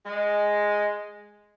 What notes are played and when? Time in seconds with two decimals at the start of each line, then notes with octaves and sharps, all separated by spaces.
0.06 G#3